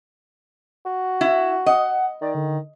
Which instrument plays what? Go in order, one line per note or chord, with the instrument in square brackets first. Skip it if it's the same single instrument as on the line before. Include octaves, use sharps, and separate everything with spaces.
[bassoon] F#4
[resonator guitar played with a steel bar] E4
[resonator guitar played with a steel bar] D#5 [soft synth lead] F#5
[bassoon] D#3 [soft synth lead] D5
[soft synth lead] D3